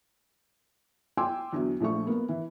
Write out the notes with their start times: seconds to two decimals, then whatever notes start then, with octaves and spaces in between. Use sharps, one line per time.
1.17 G5 G#5 C6 D6 E6
1.52 E2 D3 F#3 E4
1.80 A#1 F3 A3 C#6
2.07 A#3 B3
2.29 E3